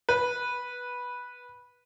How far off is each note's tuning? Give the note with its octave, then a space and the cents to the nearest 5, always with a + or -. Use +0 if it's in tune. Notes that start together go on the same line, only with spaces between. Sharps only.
B4 -10